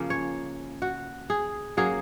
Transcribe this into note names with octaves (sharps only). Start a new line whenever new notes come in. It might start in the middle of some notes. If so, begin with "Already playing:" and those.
Already playing: C#3 F3 A#3 C#4
C#5
F#4
G#4
F#3 A#3 C#4 G#4